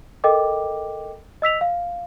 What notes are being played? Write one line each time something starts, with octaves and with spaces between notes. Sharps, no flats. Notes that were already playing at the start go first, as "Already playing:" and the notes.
A4 A#4 D#5 G5 D6
D#5 E6 B6 F7
F5